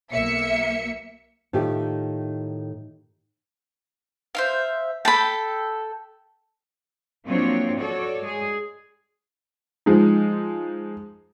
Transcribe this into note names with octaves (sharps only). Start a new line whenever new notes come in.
B1 A#3 E5 C#7
A2 D#3 A3 F4 G4
C5 E5 F5
A4 G5 A5 B5
F3 F#3 A#3 C4 D4 C#5
F#4 A4 C#5 D5
G#3 G#4
F3 G#3 D#4